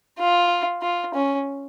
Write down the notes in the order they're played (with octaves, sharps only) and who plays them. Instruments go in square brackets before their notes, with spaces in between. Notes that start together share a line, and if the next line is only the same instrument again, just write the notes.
[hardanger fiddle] F4
F4
C#4